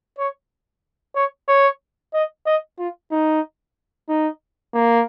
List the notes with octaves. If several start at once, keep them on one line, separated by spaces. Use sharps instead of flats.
C#5
C#5
C#5
D#5
D#5
F4
D#4
D#4
A#3